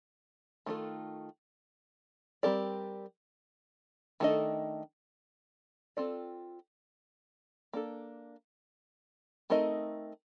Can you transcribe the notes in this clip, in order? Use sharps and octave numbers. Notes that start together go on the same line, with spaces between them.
D#3 A3 D4 F4 A4
G3 C4 G4 A#4 D5
D#3 A3 D4 A4 D#5
C4 F4 A4 D5
A#3 D4 A4
A3 C4 D#4 A#4 D#5